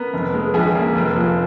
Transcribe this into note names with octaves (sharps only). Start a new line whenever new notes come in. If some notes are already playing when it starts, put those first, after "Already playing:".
Already playing: B3 A#4
F1
G#3
A#1 G#4
A#3
F1
F3